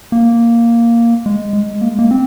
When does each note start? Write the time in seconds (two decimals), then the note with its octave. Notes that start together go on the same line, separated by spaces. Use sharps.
0.12 A#3
1.26 G#3
1.53 G#3
1.81 A#3
1.89 G#3
1.99 A#3
2.11 C4